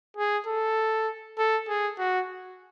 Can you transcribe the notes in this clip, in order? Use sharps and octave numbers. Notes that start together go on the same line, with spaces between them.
G#4
A4
A4
G#4
F#4